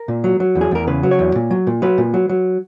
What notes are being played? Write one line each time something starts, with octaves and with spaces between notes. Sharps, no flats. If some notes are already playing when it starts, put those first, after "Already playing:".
Already playing: A#4
A#2
F#3
F#3
E2
G#4
E2 A#4
C#3 B4
F#3
C#5
E2
A#2
F#3
A#2
F#3 B4
A#2
F#3
F#3